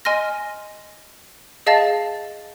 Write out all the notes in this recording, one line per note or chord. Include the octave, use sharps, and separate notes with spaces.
D#5 G#5 C6 F6 A#6
G#4 D#5 F5 A5 A6